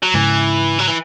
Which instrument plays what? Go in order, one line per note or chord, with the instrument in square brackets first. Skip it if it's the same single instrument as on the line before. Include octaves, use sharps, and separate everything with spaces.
[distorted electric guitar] F#3
[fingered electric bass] G#2 C#3 [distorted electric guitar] E3
[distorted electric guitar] F#3
E3